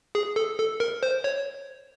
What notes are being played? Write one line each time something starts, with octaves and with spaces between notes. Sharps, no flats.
G#4
A4
A4
A#4
C5
C#5